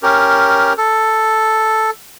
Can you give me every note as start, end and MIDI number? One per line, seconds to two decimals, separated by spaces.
0.03 0.73 61
0.03 0.73 67
0.03 0.73 70
0.78 1.90 69